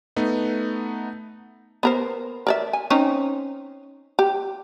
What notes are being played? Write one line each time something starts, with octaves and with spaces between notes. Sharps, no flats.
A3 B3 D#4
B3 A#4 C5
A#4 D5 E5
G#5
C4 C#4 D#4
G4